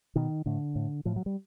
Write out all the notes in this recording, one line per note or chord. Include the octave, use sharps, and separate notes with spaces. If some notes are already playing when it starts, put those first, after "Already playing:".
B2 D#3
A2 D3
A2
A2 F3
F#3
G3